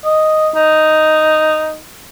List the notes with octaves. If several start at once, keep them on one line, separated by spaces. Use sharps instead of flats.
D#5
D#4